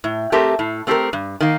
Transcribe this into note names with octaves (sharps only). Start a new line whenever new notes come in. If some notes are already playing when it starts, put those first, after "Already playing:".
A2
A3 C4 G4 A#4
A2
A3 C4 G4 A#4
G2
D#3 A#3